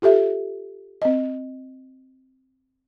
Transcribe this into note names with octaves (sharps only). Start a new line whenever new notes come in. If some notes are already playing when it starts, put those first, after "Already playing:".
F4 G4 A4 E5
C4 D#5